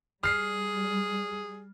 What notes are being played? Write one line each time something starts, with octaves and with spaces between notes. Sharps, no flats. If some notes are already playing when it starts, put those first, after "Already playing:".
G3 G#4 F6 C7